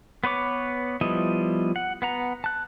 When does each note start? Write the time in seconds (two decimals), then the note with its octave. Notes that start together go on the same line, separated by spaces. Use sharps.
0.24 B3 B4 C#5 D6
1.01 F3 G3 B3 E4 D#5
1.76 F#5
2.02 B3 F#5 A#5
2.44 A5 F#6